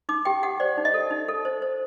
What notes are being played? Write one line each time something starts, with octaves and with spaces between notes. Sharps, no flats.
D#4 D6
G4 G5
G4 F#5
C5 D5
D#4
D#5
A4
D#4
A4
C5
C5